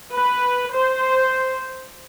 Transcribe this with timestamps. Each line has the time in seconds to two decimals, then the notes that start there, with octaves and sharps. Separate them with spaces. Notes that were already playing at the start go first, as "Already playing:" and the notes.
0.15 B4
0.74 C5